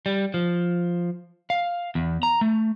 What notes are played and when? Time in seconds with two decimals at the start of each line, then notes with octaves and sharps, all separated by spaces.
0.06 G3
0.34 F3
1.50 F5
1.95 E2
2.23 A#5
2.41 A3